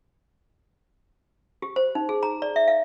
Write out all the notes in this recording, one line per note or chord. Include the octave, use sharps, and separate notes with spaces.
G4
C5
D#4
G#4
A#5
D5
E5
F5